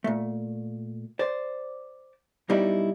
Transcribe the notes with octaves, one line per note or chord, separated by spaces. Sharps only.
A#2 A3
C5 D5
B1 B2 G3 D#4 E4 D5